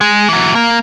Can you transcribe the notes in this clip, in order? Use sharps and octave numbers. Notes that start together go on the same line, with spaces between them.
G#3
E3 F#3
A#3